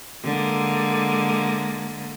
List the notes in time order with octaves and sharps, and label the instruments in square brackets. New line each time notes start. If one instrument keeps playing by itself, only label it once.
[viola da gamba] D3 G#3 A#3